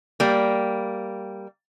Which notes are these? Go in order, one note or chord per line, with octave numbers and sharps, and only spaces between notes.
G3 A#3